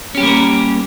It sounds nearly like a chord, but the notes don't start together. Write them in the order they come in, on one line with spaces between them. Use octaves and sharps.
C#4 G4 G3 A#3 A#4